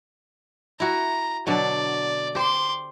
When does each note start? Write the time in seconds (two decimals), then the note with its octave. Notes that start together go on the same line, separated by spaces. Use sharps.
0.80 E4 F#4 A#5
1.47 B2 D3 F#3 D5
2.35 G4 C5 C6 D6